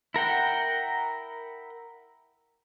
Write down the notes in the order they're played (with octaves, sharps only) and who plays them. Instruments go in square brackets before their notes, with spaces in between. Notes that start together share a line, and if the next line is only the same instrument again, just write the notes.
[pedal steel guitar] E4 A#4 F#5 G5